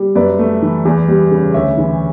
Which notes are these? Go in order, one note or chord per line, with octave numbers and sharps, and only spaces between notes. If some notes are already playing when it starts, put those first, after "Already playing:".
Already playing: G3
F#2 B4 D5
A3
E3
E2
G3
C#3
D2 C#5 E5
E3